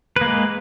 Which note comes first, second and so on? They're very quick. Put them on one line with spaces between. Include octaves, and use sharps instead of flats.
B4 A#3 G#3